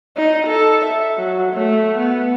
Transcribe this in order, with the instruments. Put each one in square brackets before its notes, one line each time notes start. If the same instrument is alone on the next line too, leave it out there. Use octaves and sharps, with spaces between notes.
[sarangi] D#4
A4
E5
F#3
A3
B3